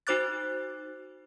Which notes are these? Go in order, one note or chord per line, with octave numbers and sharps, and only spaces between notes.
D#4 F#4 C5 D6 F#6 A6